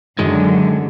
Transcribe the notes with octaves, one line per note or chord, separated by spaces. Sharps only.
F#2 D3 D#3 G#3